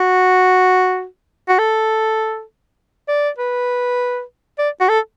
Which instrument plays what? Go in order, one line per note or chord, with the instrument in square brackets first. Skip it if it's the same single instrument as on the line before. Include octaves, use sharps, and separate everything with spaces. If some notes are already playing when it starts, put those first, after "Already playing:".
Already playing: [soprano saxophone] F#4
F#4
A4
D5
B4
D5
F#4
A4